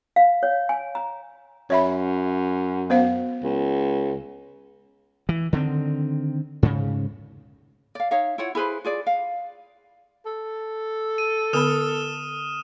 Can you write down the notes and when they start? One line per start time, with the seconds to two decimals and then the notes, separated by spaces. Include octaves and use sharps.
0.16 F5
0.43 C#5
0.69 G#5
0.95 A#5
1.70 F#2 C#5 E5 B5
2.90 B3 C5 F5
3.43 C#2
5.29 E3
5.53 D3 D#3 A3 C4
6.63 G#2 C#3
7.95 D5 F5
8.11 D#4 C#5 E5 F5
8.38 E4 F4 C#5 F#5
8.55 E4 G#4 B4 C5
8.85 F4 G#4 D5
9.07 F5
10.26 A4
11.18 D#7
11.53 D3 B3 B5 D#6 F6 E7